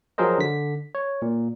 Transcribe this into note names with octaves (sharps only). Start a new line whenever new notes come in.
F3 F#3 G#4 A#4 C5 D#5
D3 B6
C#5
A#2